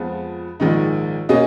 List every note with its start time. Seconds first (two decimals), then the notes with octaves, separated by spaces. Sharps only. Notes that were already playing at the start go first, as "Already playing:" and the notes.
Already playing: F2 F3 G#3 B3 F4
0.60 A#1 G#2 D#3 G#3 D#4
1.29 B2 A#3 C#4 G#4 D#5